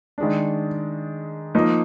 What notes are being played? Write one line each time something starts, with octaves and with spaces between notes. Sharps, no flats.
D#3 G#3 D4
F3 A#3 D#4